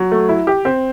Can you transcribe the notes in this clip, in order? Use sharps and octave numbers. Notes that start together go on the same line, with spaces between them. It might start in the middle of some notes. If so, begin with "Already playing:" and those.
Already playing: F#3
A3
E4
G4
C4